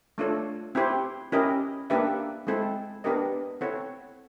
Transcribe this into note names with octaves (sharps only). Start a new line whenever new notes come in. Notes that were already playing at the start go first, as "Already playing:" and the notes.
A3 D4 F4 A4 C#5
C4 E4 G4 C5
C#4 E4 G4 A#4 D#5
A#3 D4 G4 B4 E5
G#3 C4 E4 A4
B3 D4 G4 A#4 D#5
C4 E4 A4 C#5 F#5